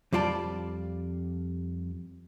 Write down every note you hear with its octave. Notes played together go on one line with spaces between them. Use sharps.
F2 G3 F4 D5 A5